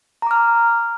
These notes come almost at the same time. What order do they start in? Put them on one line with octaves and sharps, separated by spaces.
A#5 D6 F6